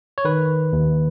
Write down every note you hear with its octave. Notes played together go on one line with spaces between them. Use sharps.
C#5
D#3 B4
D#2